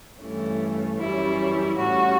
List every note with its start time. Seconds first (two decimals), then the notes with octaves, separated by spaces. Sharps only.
0.21 G2 E3 A3 C#4
0.99 F#2 E3 G3 C#4 E4
1.77 A2 G3 C#4 F#4